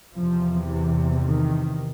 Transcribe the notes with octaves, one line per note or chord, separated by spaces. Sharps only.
E2 C3 F3
E3
D#3